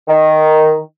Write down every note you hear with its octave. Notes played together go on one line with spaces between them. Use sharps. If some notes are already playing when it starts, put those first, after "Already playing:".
D#3